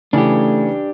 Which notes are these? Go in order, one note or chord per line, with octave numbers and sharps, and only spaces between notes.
C#3 E3 A3 D4 G4